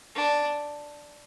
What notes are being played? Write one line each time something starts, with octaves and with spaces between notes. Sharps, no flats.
D4